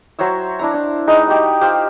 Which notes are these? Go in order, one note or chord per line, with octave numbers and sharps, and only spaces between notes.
F#3 C5 C#5 E5
D4 E4 A#5
D4
G#3 D#4 B4
F#4 G4
F4 G4 C5 F5